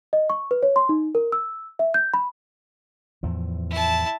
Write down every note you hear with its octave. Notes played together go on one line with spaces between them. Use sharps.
D#5
C#6
B4
C#5
C6
D#4
A#4
E6
E5
G6
B5
E2 A2 F3
E4 A5